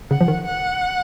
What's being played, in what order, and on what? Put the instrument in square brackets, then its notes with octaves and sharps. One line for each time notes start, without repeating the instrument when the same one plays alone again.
[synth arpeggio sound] C#3 [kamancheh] F#5
[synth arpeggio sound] F3
D#3
[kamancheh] F#5